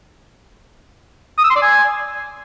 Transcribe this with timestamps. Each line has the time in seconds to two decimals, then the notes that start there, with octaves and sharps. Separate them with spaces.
1.38 D#6
1.44 E6
1.50 C6
1.56 D5
1.62 G#5